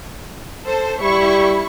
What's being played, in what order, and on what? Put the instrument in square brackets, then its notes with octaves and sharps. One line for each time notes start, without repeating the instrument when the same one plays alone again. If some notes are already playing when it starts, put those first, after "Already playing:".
[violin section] A4 C5
[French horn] G3 [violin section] E4 C#6